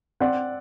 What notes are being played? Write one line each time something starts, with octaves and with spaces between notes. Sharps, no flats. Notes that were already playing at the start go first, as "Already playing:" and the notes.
C4 D5 F#5